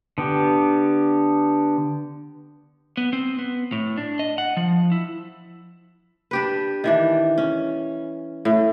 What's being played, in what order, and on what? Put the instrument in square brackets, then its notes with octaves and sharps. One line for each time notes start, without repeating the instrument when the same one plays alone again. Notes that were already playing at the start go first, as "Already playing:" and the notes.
[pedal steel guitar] D3 B3 G4
[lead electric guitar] B3
C4
B3
A2
D4
D#5
F#5
F3
E4
[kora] D4 G4 B4
D#3 E3 D4
C#4
A2